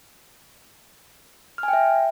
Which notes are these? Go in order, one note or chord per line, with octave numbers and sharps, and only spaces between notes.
F6
G#5
G5
E5